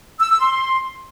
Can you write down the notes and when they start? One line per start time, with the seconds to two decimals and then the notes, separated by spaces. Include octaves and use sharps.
0.20 E6
0.30 E6
0.40 C6